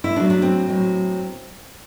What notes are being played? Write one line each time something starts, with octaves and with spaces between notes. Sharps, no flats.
E4
A2 F#3 D4
D4
C4
A2 F#3